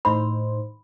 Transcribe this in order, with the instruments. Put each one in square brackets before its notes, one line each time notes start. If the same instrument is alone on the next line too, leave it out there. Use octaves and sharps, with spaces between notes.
[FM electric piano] A2 D#4 C5 [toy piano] B5